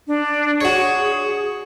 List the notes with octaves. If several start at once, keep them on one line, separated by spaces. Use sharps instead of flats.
D4
F#4 G#4 C#5